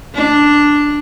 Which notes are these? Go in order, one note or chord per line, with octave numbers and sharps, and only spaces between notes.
D4